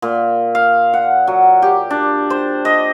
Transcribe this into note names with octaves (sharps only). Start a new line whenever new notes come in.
A#2
F5
F#5
F#3
G4
D4
C5
D#5